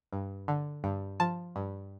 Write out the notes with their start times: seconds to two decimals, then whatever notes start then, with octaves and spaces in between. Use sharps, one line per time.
0.13 G2
0.48 D3
0.84 G2
1.20 F3 A5
1.56 G2